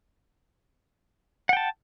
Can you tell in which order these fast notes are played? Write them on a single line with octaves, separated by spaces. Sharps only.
F#5 G5 A5